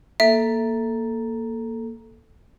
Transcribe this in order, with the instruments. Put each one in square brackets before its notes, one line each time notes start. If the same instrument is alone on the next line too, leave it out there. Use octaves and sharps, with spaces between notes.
[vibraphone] A#3 A4 [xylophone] E5